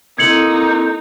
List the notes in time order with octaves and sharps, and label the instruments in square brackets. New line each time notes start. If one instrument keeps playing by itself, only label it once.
[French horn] A#3 [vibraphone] C4 E4 A4 [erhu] D#4 [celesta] G#6 C#7 F#7